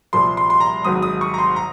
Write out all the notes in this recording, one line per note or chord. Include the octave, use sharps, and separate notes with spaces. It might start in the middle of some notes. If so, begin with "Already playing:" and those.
C2 A#2 F3 C6
C6
C6
A#5
G#1 G#2 F#3 D#6
D#6
C#6
A#5
C6
A#5